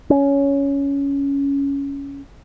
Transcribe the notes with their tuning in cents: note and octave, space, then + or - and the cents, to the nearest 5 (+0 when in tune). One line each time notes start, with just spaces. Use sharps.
C#4 +10